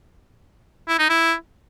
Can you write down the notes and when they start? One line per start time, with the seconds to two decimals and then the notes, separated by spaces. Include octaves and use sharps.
0.88 E4
0.99 D#4
1.09 E4